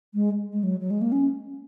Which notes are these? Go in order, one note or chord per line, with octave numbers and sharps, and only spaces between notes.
G#3
G#3
F#3
F#3
G#3
A#3
C#4